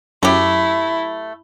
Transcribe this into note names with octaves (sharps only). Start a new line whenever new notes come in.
F#2 A3 E4 G4